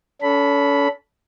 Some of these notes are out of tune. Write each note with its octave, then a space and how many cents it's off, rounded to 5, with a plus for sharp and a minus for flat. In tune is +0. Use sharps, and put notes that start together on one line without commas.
C#4 +40 A4 +0 B5 +0